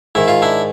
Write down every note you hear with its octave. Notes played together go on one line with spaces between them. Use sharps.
G#2 D#3 E4
F4
D4 E4